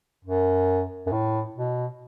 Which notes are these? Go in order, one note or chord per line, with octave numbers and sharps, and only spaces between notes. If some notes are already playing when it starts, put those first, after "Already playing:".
F#2
F#2
A2
B2